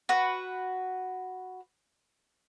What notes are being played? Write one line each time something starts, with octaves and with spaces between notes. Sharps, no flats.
F#4 B4